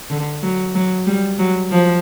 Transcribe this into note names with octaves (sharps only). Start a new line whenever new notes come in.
D3
F#3
F#3
G3
F#3
F3